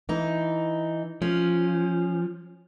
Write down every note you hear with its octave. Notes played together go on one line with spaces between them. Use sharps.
E3 D#4
F3 C#4